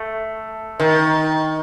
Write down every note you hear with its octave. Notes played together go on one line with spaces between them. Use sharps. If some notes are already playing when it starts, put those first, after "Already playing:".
Already playing: A3
D#3